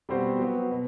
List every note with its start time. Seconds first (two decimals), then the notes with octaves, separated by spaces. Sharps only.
0.09 B2 G3 C4 F#4 C5
0.39 F#3 B3 F#4
0.71 B2